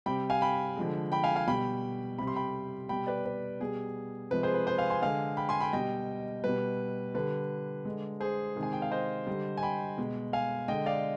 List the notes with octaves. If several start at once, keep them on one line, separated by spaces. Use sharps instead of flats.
C3 G3 G5 B5
F5 G#5
G5 B5
D3 F3 G#3
G5 B5
F5 G#5
F5 G#5
B2 G3 G5 B5
C3 G3 B5
C6
G5 B5
B2 G3 G5 B5
B4 D5
B4
B2 G3 G#4
C3 F3 G#3 B4
G#4 C5
B4
G#4 C5
F5 G#5
G#5 C6
D3 G#3 F5 G#5
G5 B5
G#5 C6
G5 B5
B2 G3 D#5 G5
B2 G3 B4
D3 G3 B4
D3 G#3
G#4 C5
C3 D#3 G#3
G#5
G5
F5
C5 D#5
D3 G3
G#5
G5 B5
B2 G#3
F5 G#5
D3 G#3 D#5 G5
D5 F5